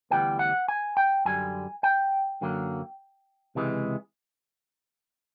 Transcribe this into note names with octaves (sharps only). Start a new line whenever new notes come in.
D2 C#3 E3 G3 B3 G5
F#5
G#5
G5
F#2 D3 G3 G#5
G5
F#2 D3 F#3 A#3
C#2 C3 E3 G#3